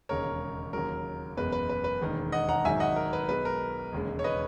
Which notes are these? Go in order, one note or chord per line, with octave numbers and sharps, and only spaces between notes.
E1 D#2 C#3 G#3 A#4 C#5
D#2 C#3 F#3 A#4
F#1 E2 B2 G#3 B4
B4
B4
B4
E1 D#2 D#3 G#3
D#5 F#5
F#5 A#5
G#1 G#2 D#3 F#3 E5 G#5
D#5 F#5
A#4
B4
B1 B2 G#3 B4
A#4
E1 D#2 C#3 G#3
C#5
B4 D#5